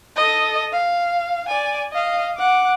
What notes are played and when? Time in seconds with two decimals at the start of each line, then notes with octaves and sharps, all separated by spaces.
0.16 A4 D#5
0.72 F5
1.48 D5 G#5
1.92 D#5 F5
2.38 F#5 D6